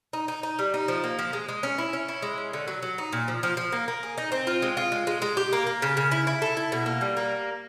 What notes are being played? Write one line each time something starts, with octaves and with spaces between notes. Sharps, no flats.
D#4
D#4
D#4
G3
D#4
F3
A#3
F3
G#3
G#3
C#4
E4
C#4
E4
G#3
C#4
D3
F#3
F#3
D#4
A#2
F3
F3
F3
A#3
A#3
G#4
D#4
C4
F4
G#3
F4
G#3
G#3
G#3
G4
A#3
A#3
C#3
C#3
E4
E4
A4
E4
B2
A#3
G3
A#3